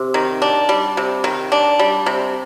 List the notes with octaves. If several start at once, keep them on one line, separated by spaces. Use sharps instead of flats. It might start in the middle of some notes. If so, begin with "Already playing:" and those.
Already playing: C3
D#3
D4
G3
C3
D#3
D4
G3
C3